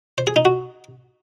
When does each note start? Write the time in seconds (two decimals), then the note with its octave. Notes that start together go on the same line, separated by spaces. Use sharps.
0.18 C5
0.27 G#4
0.36 D#4
0.45 F#4